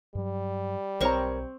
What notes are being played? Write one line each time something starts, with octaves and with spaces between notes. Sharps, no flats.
G2 F#3 G3
B1 C4 A#4 C#5 A#5 C#6